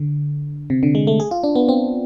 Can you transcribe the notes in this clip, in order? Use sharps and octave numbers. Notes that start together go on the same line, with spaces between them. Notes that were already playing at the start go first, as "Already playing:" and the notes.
Already playing: D3
C3
D3
G#3
A3
G#4
F4
D4
B3
C4